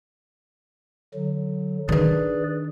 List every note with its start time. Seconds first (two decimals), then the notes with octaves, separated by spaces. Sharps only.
1.15 D3 F#3
1.89 D#3 D4 G#4 B4 D5